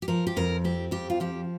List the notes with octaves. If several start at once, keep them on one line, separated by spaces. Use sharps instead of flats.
G4
F3 A#4
G4
F2 A#4
C4 G4
F2 G4
F4
F3 G4